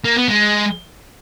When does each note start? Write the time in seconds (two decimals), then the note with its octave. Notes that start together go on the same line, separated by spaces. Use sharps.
0.05 A#3
0.17 B3
0.28 G#3